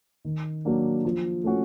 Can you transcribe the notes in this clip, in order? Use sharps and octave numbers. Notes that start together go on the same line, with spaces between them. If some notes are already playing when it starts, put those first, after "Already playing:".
D#3
F#3 A#3 D4
F3
A3 C#4 F#4